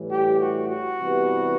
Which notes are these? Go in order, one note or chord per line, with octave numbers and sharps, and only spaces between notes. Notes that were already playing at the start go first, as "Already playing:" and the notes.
Already playing: A2 E3 G3
G4
F#4
F#4
C3 E3 G3 B3